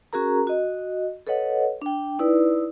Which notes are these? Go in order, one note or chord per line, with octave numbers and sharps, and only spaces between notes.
C#4 F#4 G#4 A#4 A#5
F#4 D#5
A4 B4 C#5 D#5 F#5
D4 G5
D#4 E4 B4 D5